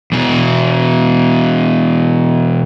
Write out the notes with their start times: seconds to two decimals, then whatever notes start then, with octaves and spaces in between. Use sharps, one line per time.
0.12 E2 B2